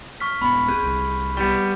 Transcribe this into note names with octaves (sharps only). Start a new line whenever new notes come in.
C#6 F6 B6
D#1 B3 B5
C4 G#4 F#6
C2
G3 B3 G7